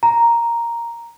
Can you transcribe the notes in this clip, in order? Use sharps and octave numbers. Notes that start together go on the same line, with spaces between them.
A#5